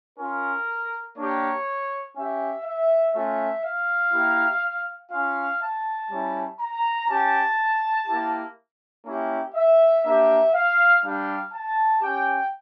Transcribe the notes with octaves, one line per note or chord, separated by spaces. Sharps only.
C#4 F4 A#4
A#3 D4 G4 C#5
C#4 G4 E5
E5
A3 C#4 F4 E5
F5
A#3 E4 G4
C#4 F4 F5
A5
G3 C#4 E4
A#5
C#4 G4 A5
A#3 E4 G4
A#3 C#4 E4 G4
E5
A#3 D4 G4 E5
F5
G3 D4 G4 F5
A5
C#4 G4 G5